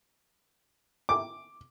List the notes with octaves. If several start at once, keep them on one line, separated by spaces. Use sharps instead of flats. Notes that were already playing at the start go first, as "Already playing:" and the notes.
D6